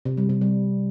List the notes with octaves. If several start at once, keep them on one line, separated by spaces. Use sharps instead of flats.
C3
G3
C3
G3